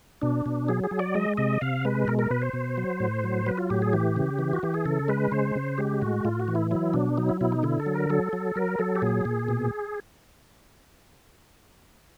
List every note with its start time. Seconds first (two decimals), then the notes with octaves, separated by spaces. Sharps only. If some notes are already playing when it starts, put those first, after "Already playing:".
0.22 B2 D4
0.46 B2
0.68 F#3 G#4
0.84 G#4
0.91 F#3
0.99 D5
1.15 G#3 D#5
1.37 C3 D#5
1.61 C3 F5
1.85 G#3 B4
2.07 B2 A#4
2.19 A#4
2.31 B2 B4
2.42 C5
2.53 B2
2.77 F#3
3.00 A2
3.24 F#3
3.46 F#3 B4
3.58 F4
3.70 A2 G4
3.82 G#4
3.93 E3 G4
4.16 C#3
4.39 E3
4.53 F#4
4.63 E3 G4
4.74 G#4
4.85 C#3 A4
5.08 G#3 B4
5.32 C#3 C5
5.56 C#3
5.78 G#3 G4
6.01 A2 F#4
6.25 A2 F4
6.39 F#4
6.48 E3
6.55 E4
6.71 F#3 E4
6.94 B2 D4
7.17 F#3 D#4
7.29 E4
7.41 B2 E4
7.52 D#4
7.63 D3 E4
7.80 A4
7.86 F#3
7.94 A#4
8.10 F#3 A4
8.33 F#3
8.56 F#3 A#4
8.79 F#3 A4
8.96 G4
9.02 A#2 G#4
9.25 A#2
9.49 B2